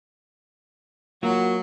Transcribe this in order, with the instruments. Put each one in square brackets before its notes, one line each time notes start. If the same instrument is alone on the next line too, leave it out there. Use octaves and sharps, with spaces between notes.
[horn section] F#3 [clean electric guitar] A#3 F4 F#4